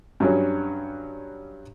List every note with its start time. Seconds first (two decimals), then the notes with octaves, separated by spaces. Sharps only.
0.20 G2 F#3 C#4